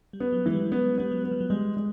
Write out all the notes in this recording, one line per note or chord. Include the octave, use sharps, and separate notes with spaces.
G3
B3
F#3
E3 G#3
G3
G#3 B3
G3 B3
F#3
B3
F3
F#3
G3 G#3
G#3